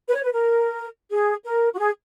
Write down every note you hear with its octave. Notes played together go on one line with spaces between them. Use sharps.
B4
C#5
B4
A#4
G#4
A#4
F#4
G#4